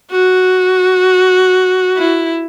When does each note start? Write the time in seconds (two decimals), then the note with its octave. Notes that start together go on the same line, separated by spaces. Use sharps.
0.11 F#4
1.97 E4